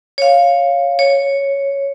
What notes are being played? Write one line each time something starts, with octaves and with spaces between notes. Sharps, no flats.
C#5 F5
C#5